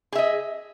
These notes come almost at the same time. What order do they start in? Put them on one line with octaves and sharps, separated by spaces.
G#4 E5 D#5